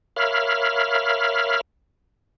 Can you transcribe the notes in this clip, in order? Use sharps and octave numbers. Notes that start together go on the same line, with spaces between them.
A#4 C#5 E5 F5 B5 F6